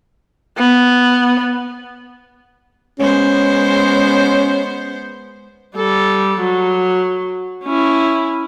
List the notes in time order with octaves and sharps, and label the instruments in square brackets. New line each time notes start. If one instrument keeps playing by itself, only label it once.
[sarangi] B3
[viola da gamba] G#3 B3 C5 [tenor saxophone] C#4
[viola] G3 A4
F#3
C#4 E4